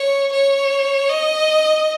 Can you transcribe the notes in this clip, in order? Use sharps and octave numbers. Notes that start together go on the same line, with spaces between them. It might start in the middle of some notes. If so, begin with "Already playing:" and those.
Already playing: C#5
C#5
D#5